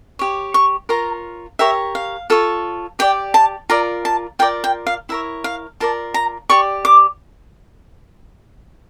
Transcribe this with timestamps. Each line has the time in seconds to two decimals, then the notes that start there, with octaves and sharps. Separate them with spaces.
0.19 G4 C#5
0.54 C#6
0.89 F4 A#4 C#5 A#5
1.59 G4 A#4 C#5 E5
1.95 F5
2.30 F4 A4 C#5
2.99 G4 D5 G5
3.34 A5
3.69 F4 A#4 D5 A#5
4.05 A5
4.39 F4 A#4 D5 G5
4.64 G5
4.87 F5
5.09 E4 A#4 C#5 E5
5.44 F5
5.80 F4 A#4 D5 A5
6.14 A#5
6.50 G4 D5 C#6
6.85 D6